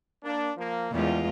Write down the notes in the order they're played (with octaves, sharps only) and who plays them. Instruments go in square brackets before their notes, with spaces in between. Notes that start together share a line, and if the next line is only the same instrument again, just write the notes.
[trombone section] A#3 D4
F3 A#3
[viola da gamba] E2 G#3 F4 [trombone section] A#2 C#3 G3